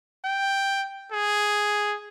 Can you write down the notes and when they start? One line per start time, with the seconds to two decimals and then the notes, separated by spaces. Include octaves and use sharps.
0.25 G5
1.12 G#4